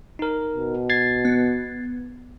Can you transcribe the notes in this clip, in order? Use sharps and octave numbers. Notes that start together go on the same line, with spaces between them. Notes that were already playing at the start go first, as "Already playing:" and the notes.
D#4 A#4
B2
G#6 A6 C7
B3